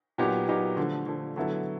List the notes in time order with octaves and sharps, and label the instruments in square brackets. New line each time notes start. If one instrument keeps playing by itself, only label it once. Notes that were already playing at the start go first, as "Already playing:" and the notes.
[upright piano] A#2 F#3 B3 D#4 G4
A#2 F#3 B3 D#4 G4
D3 F3 A3
D3 F3 A3
D3 F#3 B3 E4 A4